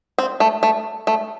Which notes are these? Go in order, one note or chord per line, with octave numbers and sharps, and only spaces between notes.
C4
A3
A3
A3